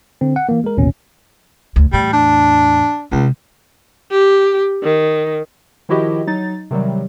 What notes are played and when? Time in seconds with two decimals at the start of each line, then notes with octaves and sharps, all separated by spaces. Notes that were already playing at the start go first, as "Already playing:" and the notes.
0.21 D3 C4
0.36 F#5
0.49 E3 A#3
0.64 G#3 A#4
0.77 A1 D#2 B2 C#4
1.76 D2
1.93 E2 A2 G3
2.13 D4
3.11 C#2 C3 G#3
4.11 G4
4.83 D#3
5.89 D#3 F3 E4 F#4 G4 D#5
6.27 F#3 D#4 A6
6.71 C3 D#3 F#3 G3